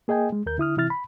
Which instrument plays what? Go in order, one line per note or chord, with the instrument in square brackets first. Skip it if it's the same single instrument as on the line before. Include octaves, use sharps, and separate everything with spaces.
[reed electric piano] A#3 G#4 D#5 G5 G#5
G#3
D#2 A#4 G6
D3 E4 D#6 F6
C3 E3 E4 F6 A6
B5